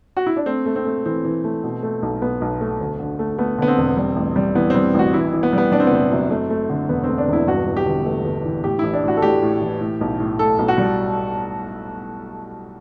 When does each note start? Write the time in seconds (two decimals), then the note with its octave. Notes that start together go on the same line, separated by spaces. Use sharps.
0.17 F#4
0.26 E4
0.36 D4
0.46 A3 C4
0.66 A3
0.76 C4
0.85 A3
1.05 E3 C4
1.24 E3
1.44 A3
1.64 B2
1.83 A3
2.02 B1
2.22 B1 B3
2.41 B1
2.61 A3
2.80 D2
2.99 D3
3.19 A3
3.38 A3 B3
3.58 D3 B3
3.68 C4
3.78 E1
3.97 G3
4.16 A1
4.36 G3
4.55 E3 B3
4.70 G3 C4
4.94 A1 F#4
5.14 E3 E4
5.33 E3
5.43 B3
5.53 G3 B3
5.72 G3 D4
5.80 C4
5.87 B3
5.92 F#1 C4
6.11 F#2
6.31 A3
6.50 A3
6.70 D3
6.89 E1 B3
7.04 A3 C4
7.18 D4
7.28 E1 E4
7.47 G2 F#4
7.67 E3
7.77 G4
7.86 G1
8.05 A3
8.25 G1
8.45 E3
8.64 A2 G4
8.79 A1 E4
8.93 D4
9.03 A2
9.08 F#4
9.17 A4
9.22 A1 G4
9.42 A2
9.61 E3
9.81 A2
10.01 B1
10.20 A2
10.39 A2 A4
10.59 B1
10.68 F#4
10.78 G3